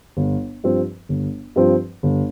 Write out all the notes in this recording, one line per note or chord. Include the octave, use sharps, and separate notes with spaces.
G1
G2 F3 C4
G1
G2 F3 C4
G1